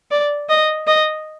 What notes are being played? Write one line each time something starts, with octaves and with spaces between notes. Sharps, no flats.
D5
D#5
D#5